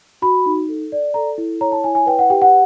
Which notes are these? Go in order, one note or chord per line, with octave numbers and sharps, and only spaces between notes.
F#4 B5
D#4
A4
D5
A4 A#5
E4
C#5 A#5
A5
E4 G#5
G#5
B4 G5
F#5
G4 G5
F#5